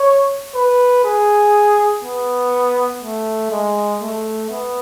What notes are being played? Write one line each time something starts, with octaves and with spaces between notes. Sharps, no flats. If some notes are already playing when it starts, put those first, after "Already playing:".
Already playing: C#5
B4
G#4
B3
A3
G#3
A3
B3